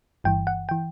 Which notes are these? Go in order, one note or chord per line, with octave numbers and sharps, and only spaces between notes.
G1 G2 E3 G5
F#5
E3 G5